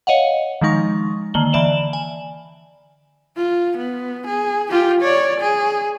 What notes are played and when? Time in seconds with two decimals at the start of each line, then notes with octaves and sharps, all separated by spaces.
0.07 C#5 D#5 F5 F#5
0.61 D#3 F3 G#3 D#4 C#6
1.34 D3 D#3 A#3 F#7 G7
1.53 D3 E3 D5 E7 F#7
1.93 G#5
3.37 F4
3.77 B3
4.27 G#4
4.71 F4 G4
5.01 C#5 D5
5.40 G#4